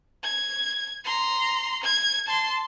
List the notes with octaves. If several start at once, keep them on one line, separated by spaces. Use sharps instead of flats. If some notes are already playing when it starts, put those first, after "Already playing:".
G#6
A#5 C6
G#6
A5 C6